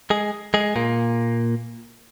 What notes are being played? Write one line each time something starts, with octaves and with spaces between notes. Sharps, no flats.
G#3 G#4
G#3 G#4
A#2 A#3